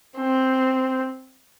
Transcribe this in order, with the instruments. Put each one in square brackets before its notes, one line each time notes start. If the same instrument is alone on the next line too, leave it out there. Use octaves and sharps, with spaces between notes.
[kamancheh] C4